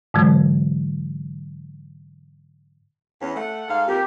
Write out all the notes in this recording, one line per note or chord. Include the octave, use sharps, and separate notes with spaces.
G#2 D3 E3 F#3 G#3
E2 C#4
A3 F#5
G#2 A4 F5
F2 A#3 G4 A#4